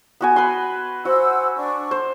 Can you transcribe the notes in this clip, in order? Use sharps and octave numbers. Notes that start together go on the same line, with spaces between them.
B3 F#4 G#5
B4 B5 C6
F#4 C5 F#5 E6
D4 C#6
C5